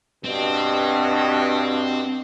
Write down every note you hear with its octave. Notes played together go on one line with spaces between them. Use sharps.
G2 B2 C4